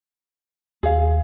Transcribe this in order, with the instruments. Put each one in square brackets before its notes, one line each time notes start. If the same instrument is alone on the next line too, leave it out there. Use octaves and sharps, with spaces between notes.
[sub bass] D#2 [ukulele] G#4 F5